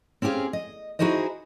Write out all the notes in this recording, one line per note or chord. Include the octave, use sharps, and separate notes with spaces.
C4 C#4 G4 G#4 F5
D#5
D#4 E4 F#4 G#4 C5 D#5